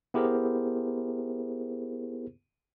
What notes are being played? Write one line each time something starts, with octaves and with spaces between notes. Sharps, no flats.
B3 E4 G4 G#4 A#4 C5